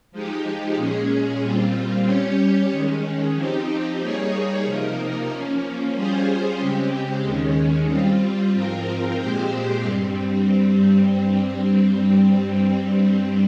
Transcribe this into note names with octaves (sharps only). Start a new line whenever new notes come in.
F3 G#3 D#4 G4
A#2 G#3 C#4 G#4
A#2 G3 C4 F4
G3 C#4 G4 C#5
D#3 G#3 C#4
F3 C4 D#4 G4
G3 A#3 D#4 G#4 C#5
C3 F3 A#3 D#4 A#4
F3 A#3 C#4
G3 C#4 F4 G#4 C5
C#3 G#3 C4 G4
D#2 D#3 G#3 C#4
G3 C4 F4
G#2 F3 C4 F4 A#4
A#2 G#3 C4 G4 C5
G2 G3 C4